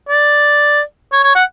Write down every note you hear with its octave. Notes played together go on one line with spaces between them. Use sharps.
D5
C#5
C#5
F#5